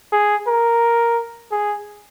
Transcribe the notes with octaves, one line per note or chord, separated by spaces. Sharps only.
G#4
A#4
G#4